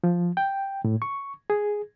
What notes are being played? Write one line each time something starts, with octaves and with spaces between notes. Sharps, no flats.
F3
G5
A2
C#6
G#4